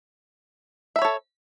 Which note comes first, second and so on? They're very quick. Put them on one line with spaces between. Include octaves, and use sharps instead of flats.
E5 B5 C#5 A4